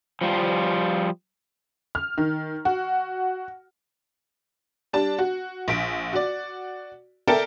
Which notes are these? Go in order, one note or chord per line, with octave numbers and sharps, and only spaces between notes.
F3 G3 F4
F6
D#3
F#4
G3 D4 A5
F#4
A#1 B6 D7
F#4 D5
A4 A#4 D5 E5 G5 A5